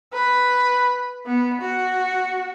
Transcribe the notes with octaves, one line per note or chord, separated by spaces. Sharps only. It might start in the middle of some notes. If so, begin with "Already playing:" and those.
B4
B3
F#4